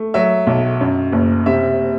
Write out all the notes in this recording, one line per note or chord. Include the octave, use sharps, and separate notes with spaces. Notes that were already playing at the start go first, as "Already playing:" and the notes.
Already playing: A3
F#3 E5
B1
F#2
F#1
C3 E5